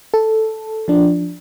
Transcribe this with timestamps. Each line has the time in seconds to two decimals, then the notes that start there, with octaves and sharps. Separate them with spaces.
0.14 A4
0.88 F3 D4